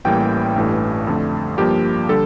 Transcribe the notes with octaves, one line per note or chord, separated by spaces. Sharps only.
A1 A2 E3 G3 A#3 G5
A1 G2 E3 A3
F2 D3 A3
G2 F3 A#3 G4
D3 G3 A4